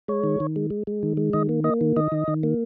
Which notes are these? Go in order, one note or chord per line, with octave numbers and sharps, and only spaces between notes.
G#3 C#5
D#3
D#3
G#3
G#3
G#3
D#3
G#3
D#3 D#5
A#3
A#3 D#5
D#3
D#3 D#5
D#3
D#3
A#3